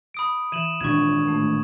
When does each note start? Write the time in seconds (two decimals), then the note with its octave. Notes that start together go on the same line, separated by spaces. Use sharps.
0.14 B5 D#6 D7
0.52 E3 D#7 E7 F#7
0.81 G#1 A#2 D4 C#6 G#6
1.24 A2 A3